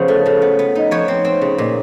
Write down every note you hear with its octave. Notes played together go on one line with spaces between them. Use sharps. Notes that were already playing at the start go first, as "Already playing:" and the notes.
Already playing: C#3 F3 B3 C5
A3
C#3
B3
B3
D#4
F3 B4 C#5
C4
C4
C#3
A#2